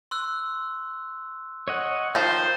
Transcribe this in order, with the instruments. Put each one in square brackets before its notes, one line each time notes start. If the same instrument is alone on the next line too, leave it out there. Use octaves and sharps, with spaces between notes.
[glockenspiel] C6 E6 F#6
[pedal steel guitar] C#5 D#5 F#5
[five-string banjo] D#3 F3 [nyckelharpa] C5 [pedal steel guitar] G5 F6 G6 [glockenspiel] A6